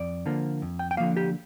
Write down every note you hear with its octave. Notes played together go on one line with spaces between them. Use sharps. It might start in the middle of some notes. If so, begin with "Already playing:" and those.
Already playing: F2 D5
D3 F3 A#3
F2
G5
G5
D3 F3 A#3 F5
G4